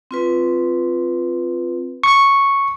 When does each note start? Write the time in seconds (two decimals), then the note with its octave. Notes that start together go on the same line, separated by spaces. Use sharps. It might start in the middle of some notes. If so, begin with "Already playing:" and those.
0.11 C4 F4 B4
2.04 C#6